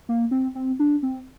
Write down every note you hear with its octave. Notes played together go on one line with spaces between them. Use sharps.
A#3
C4
C4
D4
C4